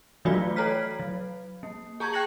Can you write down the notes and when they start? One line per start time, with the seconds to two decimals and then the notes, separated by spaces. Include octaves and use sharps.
0.25 E3 F#3 A3 F4 F#4 D5
0.56 A4 C#5 A#5 F6 B6
1.00 F#3
1.63 A#3
2.00 G#4 A5 A#5 C#6 G6 G#6
2.13 G5 F#6 G#6 A#6 C#7 F#7